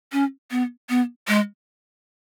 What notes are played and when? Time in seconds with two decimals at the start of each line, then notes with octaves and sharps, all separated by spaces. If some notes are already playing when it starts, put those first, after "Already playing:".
0.13 C#4
0.51 B3
0.89 B3
1.28 G#3